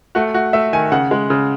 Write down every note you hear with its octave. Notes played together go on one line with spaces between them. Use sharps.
A3 F#4
A3 F#4
A3 E5
D#3 G#5
C#3 F#5
G#3
C#3